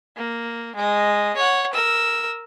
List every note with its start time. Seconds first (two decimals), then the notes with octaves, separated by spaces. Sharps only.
0.17 A#3
0.76 G#3 D#5
1.37 C#5 F#5
1.73 A#4 E6